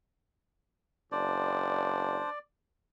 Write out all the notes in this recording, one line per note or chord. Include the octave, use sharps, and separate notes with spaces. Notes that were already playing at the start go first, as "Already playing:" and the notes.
F#1 D4 C5 D5